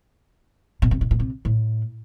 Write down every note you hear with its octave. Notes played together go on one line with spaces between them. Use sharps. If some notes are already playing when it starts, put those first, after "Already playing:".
B2
C3
B2
A#2
C3
A2